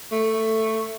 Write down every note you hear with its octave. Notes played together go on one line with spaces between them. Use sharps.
A3